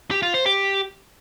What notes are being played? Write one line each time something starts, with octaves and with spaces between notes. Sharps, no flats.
G4
F4
C5
G4